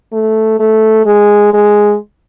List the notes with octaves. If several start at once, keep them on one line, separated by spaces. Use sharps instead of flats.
A3
A3
G#3
G#3